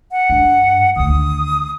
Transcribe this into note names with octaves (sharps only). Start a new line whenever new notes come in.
F#5
G2 D4
D2 D#3 D#6